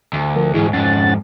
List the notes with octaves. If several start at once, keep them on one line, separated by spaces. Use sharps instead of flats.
D2
F3 A#4
D2 G#2 E3 E4 G#4
F2 G#2 C#4 F#5 A6